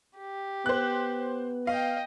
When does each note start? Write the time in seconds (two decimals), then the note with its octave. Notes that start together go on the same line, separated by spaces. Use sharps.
0.17 G4
0.66 B3 C5 F#6
1.67 D#5 F5 G5